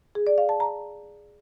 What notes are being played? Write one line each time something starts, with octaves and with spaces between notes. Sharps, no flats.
G#4
D5
F5
A5
A#5